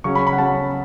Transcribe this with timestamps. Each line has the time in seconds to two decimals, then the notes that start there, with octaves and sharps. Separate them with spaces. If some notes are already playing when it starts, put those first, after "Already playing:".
0.04 C#3 F#3 C#4 C#6
0.15 B5
0.27 B5
0.33 F#5
0.38 C#3 F#3 C#4 A5